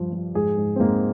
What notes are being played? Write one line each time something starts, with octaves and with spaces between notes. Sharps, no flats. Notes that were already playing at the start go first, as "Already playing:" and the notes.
Already playing: G2 F3
F3
G#2 G#4
G#2
C4
G#2 A#3